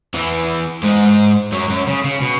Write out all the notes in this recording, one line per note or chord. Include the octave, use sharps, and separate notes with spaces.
E2 E3
G#2 G#3
F#2 F#3
F#2 F#3
C#3
C#3
B2